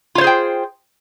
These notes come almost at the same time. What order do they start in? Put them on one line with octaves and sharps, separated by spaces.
F4 C#5 C5 G#4 G5